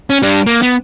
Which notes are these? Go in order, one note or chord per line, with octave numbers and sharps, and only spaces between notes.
C#4
G3 D4
A#3
B3